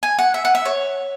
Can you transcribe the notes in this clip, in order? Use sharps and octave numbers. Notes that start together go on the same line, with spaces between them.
G#5
F#5
E5
F#5
E5
C#5